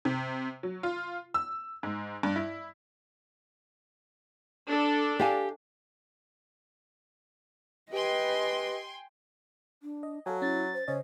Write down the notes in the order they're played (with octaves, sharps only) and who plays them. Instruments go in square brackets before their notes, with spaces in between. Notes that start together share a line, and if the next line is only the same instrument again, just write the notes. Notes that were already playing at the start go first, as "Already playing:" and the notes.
[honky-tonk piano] C3
F#3
F4
E6
G#2
G2
E4
[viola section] D4 A4
[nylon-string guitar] G4 F5 G#5
[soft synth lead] G4 [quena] B4 [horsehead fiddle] D#5 [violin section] G5 G#5 C6
[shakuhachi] D4
[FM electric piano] D#5
[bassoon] F#3 [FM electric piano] A4 F5 G#5 [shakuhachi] A5
[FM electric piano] C#4 [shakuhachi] E4 [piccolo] A6
[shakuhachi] C5
[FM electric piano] C#3 D#5 [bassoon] C#4 [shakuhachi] C5